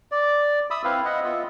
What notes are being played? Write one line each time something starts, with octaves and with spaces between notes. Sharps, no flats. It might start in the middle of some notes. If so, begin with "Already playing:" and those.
D5
E5 B5 D#6 E6
C4 E4 B4 F5
D#5 E5 F#5
B3 F4 D#5 E5